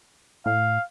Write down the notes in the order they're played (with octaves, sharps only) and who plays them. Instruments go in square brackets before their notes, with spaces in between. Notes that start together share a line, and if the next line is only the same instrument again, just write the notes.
[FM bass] A2 [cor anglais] F5